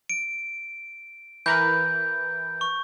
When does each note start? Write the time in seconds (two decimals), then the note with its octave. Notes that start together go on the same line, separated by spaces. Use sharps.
0.10 D7
1.46 E3 A#4 B4 G6
2.61 C#6